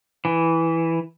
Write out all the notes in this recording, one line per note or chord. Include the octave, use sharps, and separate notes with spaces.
E3